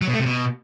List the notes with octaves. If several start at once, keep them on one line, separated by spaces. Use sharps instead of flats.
F#3
B2
A3
C3
B2